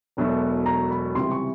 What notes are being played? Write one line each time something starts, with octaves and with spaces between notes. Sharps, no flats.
E1 E2 B2 F#3 A3
A#5
B5
C#2 C3 E3 G3 C6
C#6